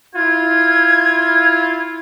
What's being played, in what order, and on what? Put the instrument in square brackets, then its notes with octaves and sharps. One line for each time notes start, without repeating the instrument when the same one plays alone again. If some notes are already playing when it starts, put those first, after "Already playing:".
[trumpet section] E4 F4 [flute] G#6